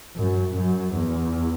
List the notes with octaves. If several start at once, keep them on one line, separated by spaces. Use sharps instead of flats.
F#2
F#2
E2